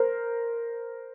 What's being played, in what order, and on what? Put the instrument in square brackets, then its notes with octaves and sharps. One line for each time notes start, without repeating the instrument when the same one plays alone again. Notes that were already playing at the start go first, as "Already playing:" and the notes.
Already playing: [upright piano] A#4 C5